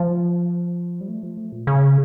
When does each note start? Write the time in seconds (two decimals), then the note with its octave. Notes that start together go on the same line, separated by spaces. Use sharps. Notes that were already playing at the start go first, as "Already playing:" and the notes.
Already playing: F3
1.01 G3
1.08 A3
1.23 F3
1.37 A3
1.52 A#2
1.67 C#3